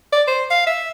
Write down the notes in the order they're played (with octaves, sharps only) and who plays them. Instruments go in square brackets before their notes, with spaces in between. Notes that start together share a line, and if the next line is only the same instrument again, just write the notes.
[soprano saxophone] D5
C5
F5
E5